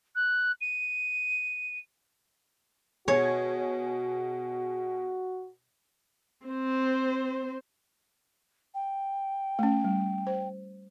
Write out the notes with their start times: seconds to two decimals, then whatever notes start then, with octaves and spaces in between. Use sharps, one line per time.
0.15 F#6
0.61 D#7
3.08 B2 F#4 G#4 C#5 G#6
6.46 C4 C5
8.74 G5
9.59 A3 C#4
9.84 G3
10.27 C5